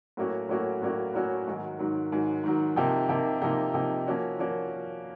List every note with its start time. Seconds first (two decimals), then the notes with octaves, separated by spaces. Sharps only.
0.17 A2 F#3 A#3 C#4 F#4
0.49 A2 F#3 A#3 C#4 F#4
0.82 A2 F#3 A#3 C#4 F#4
1.14 A2 F#3 A#3 C#4 F#4
1.48 G#2 D#3 F#3
1.79 G#2 D#3 F#3
2.12 G#2 D#3 F#3
2.44 G#2 D#3 F#3
2.76 C3 F3 A#3 D#4 G4
3.09 C3 F3 A#3 D#4 G4
3.42 C3 F3 A#3 D#4 G4
3.74 C3 F3 A#3 D#4 G4
4.07 F3 A#3 C#4 F#4
4.39 F3 A#3 C#4 F#4